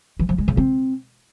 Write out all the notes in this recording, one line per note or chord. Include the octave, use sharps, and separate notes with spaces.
E3
F3
G#3
C#3
C4